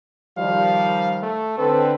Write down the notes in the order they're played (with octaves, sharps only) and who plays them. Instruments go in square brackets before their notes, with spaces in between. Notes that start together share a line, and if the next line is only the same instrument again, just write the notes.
[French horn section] D#3 F3 G3 [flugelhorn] F5
[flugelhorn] A3
[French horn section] D3 C4 B4 [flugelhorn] A4